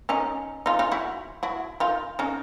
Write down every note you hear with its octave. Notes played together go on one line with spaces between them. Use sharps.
C#4 D#4
D#4 F4
D#4 F4
E4 F#4
E4 F#4
D#4 F4
C#4 D#4